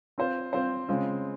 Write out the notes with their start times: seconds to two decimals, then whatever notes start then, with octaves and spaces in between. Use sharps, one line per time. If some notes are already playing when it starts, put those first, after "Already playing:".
0.18 C4 F4 C5
0.53 C4 F4 C5
0.89 C#3 G#3 C4 F4